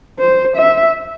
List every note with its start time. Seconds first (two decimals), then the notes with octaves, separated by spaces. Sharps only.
0.19 C5
0.56 E5